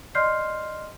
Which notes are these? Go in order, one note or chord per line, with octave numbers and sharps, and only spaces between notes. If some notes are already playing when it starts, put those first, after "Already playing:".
D5 D#5 C6 F6 G6 C7